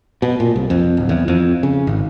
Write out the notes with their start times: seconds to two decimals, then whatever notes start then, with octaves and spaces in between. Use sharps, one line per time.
0.22 B2
0.40 A#2
0.56 C2
0.70 F2
0.97 D1
1.09 E2
1.28 F2
1.63 C#3
1.87 G#1